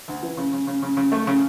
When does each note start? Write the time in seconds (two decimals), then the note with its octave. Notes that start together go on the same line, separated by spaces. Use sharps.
0.08 D2
0.23 E3
0.37 C#3
0.53 C#3
0.67 C#3
0.82 C#3
0.97 C#3
1.12 A3
1.27 C#3